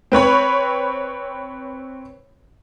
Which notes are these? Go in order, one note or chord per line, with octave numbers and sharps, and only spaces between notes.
C4 B4 C#5 B5